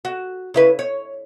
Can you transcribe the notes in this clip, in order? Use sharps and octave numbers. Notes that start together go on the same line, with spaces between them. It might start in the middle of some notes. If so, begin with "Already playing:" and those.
F#4
C#3 E4 B4
C#5